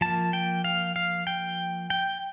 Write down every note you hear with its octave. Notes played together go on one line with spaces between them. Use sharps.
F3 A#3 A5
G5
F5
F5
G5
G5